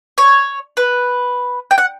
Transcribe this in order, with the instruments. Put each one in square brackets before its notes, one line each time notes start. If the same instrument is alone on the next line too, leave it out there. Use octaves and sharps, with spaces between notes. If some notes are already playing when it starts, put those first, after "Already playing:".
[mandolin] C#5
B4
G5
F#5